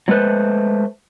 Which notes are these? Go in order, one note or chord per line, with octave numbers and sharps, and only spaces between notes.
F#3 G#3 A3 B4 C5